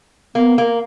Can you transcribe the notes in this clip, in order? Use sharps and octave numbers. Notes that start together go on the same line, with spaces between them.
A#3 B3
A#3